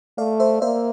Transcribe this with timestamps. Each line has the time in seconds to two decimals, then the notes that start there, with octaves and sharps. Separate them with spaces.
0.18 A3 D5 F5
0.40 C5 E5
0.62 A#3 C5 E5